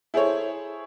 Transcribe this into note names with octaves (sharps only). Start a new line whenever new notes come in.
E4 G#4 A4 C5 C#5